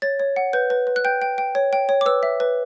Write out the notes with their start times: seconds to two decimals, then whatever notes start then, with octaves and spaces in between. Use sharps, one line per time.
0.02 C#5 A6
0.20 C#5
0.36 F#5
0.53 B4 G6
0.70 B4
0.87 B4
0.96 F#6
1.05 G5 G6
1.22 G5
1.38 G5
1.55 C#5
1.73 G5
1.89 C#5
2.01 D6
2.06 B4 E6
2.23 E5
2.40 B4